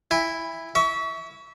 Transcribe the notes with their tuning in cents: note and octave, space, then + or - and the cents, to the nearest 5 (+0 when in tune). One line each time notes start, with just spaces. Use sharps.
E4 +0 G#5 -45
E5 -25 C#6 +30